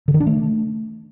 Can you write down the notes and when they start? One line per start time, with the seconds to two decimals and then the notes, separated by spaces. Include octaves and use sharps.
0.08 D3
0.14 D#3
0.20 D4
0.27 A3